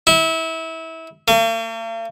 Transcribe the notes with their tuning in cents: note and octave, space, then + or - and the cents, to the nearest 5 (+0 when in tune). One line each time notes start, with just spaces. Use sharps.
E4 -25
A#3 -45